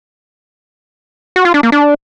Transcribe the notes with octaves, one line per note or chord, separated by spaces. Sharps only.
F#4
F4
D4
A#3
D4